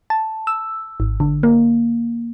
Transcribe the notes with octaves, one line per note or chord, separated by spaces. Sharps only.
A5
E6
G#1
D3
A#3